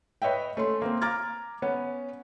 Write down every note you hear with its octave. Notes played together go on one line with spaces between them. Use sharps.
B4 C#5 D#5 E5 G5
A3 C#4 C6
A#3 C4
A#5 D6 F6 G#6 A6
B3 C#4